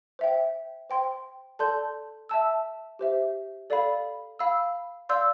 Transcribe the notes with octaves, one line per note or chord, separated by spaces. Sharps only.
C5 E5 G5
C5 G5 C6
A4 D5 A5 C6 G6
E5 A5 E6
G4 C5 E5
A4 D5 F5 B5
F5 B5 E6
D5 F5 C6 E6 G6